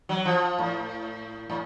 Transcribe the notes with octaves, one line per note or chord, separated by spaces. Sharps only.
F#3
F3
A2
A2